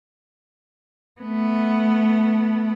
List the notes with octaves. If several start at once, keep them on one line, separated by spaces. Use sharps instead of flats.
A3 B3